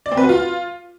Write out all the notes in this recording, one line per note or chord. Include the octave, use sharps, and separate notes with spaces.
D5
C4
B4
F#4
F4